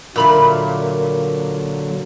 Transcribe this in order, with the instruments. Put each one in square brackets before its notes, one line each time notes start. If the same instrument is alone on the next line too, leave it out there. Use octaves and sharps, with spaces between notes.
[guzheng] A#2 [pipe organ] D3 F#3 [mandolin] E5 B5 F6